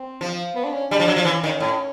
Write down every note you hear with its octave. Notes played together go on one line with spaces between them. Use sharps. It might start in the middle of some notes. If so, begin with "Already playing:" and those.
Already playing: C4
F3
B3
D4
C#4
G3 D4
F3
F#3
F3
E3 C#4
D#3 C#4
A2